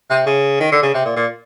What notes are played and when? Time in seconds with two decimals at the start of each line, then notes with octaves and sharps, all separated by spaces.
0.10 C3
0.26 C#3
0.60 D#3
0.72 D3
0.82 C#3
0.94 C3
1.05 A#2
1.16 A#2